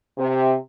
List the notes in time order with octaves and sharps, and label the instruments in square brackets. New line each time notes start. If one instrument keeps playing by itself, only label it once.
[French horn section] C3